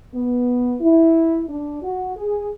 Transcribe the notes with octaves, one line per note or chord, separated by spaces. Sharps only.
B3
E4
D4
F#4
G#4